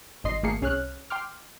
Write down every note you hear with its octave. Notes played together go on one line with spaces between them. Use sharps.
G#1 G2 D#5 C6 C7
G#1 A3 A#3 G#4 C7 C#7
C2 C#4 G#4 C#5 F6 F#6
G5 C6 D6 F6